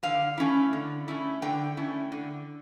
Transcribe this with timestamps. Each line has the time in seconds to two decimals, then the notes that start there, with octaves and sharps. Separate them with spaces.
0.03 D3 F5
0.38 A3 C#4 E4
0.73 D3
1.08 A3 C#4 E4
1.42 D3 G5
1.77 A3 C#4 E4
2.12 D3